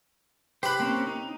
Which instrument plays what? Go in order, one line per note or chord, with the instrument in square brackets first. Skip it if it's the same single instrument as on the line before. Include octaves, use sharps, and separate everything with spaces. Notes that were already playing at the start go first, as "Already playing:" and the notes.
[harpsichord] G4 B4 [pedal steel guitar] C5 B5
[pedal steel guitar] A#3 C4 C#4
D#4